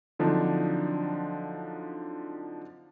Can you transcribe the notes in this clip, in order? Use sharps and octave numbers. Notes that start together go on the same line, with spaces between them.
D3 F3 F#3 C4 D4 D#4